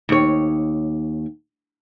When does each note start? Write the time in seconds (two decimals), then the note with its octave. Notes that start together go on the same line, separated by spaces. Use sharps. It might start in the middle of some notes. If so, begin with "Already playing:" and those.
0.09 D#2 C#5